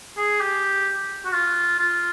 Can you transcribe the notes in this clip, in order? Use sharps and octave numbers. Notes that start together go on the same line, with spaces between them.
G#4
G4
F#4
F4
F4